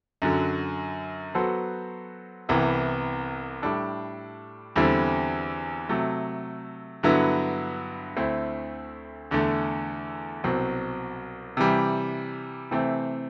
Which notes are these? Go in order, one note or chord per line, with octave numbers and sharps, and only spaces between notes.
F#2 D3 F#3
F#3 B3 F#4 A4 C5
C2 C3 E3 B3
A2 G3 D4 A4
E2 D3 G3 C4 E4
C3 F#3 A3
G2 D3 F#3 B3 E4
D2 D3 A3 C4 E4
E2 D3 A3
C2 B2 F#3 C4
C3 E3 G3
C3 E3 A3 C4